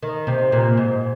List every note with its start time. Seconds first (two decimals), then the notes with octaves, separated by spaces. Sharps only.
0.03 D#3
0.27 C3
0.52 A#2
0.77 G#2